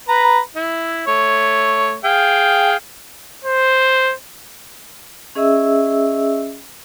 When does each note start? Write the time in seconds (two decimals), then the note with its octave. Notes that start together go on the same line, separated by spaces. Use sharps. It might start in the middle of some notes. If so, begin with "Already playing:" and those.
0.09 B4 A#5
0.56 E4
1.08 A3 C#5
2.04 G#4 F5 G5
3.45 C5
5.35 C#4 G#4 D#5 E5 E6